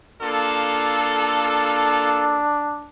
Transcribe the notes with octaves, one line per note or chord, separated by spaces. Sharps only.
A#3 D4 F4 A4